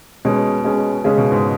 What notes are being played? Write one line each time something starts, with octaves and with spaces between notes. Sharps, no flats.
B2 G#3 C#4 G#4
G#3 C#4 G#4
C#3 G#3 C#4 G#4
B2
G#2